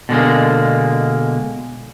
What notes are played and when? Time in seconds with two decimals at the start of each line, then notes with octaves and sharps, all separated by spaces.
0.09 B2 D3 G#3 A#3